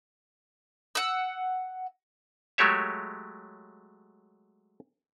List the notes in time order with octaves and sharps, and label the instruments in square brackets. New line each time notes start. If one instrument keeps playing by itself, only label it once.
[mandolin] F#5 E6
[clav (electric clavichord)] F#3 G#3 A3 G4 C#5 E5